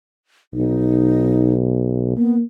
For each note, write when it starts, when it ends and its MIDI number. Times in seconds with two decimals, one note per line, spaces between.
0.54 2.15 35
0.54 1.54 63
2.17 2.43 58
2.17 2.36 59